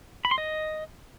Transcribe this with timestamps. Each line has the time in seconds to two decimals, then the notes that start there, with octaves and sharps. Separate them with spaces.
0.25 B5
0.31 C6
0.38 D#5